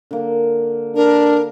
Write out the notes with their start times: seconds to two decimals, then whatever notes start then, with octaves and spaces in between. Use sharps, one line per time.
0.11 D3 A#3
0.96 D4 A#4